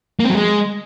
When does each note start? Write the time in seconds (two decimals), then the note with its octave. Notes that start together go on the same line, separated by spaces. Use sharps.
0.20 A#3
0.25 C4
0.30 F#3
0.35 G#3